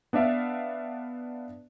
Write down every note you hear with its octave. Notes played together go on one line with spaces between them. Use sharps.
B3 D4 D5 E5 F5